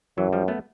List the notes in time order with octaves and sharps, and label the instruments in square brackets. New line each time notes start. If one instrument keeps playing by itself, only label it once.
[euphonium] F#2 [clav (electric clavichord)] E3 F#3
[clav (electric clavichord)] F3 G3
A3 B3